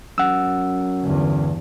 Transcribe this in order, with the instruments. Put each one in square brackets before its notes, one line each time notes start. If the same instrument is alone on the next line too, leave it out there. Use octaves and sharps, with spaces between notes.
[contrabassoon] F#2 [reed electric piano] F#5 E6
[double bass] E2 G2 [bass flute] D3